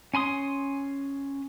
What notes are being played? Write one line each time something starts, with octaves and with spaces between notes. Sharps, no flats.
C#4 G#5 C6 D#6